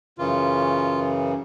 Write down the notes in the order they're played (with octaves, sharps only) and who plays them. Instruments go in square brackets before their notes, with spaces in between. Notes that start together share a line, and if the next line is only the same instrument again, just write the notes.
[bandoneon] F#2 C#3 E3 F4